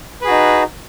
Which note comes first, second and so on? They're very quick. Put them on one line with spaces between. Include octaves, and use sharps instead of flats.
B4 G#4 F#4 D#4